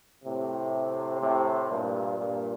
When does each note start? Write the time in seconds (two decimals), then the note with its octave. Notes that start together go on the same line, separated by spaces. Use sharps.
0.24 A2 C3
1.21 A2 C3
1.70 G2 A#2
2.19 G2 A#2